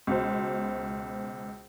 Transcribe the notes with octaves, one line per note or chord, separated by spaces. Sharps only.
C#2 B2 C5